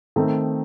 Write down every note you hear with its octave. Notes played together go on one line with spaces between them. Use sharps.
D#3 A3 C4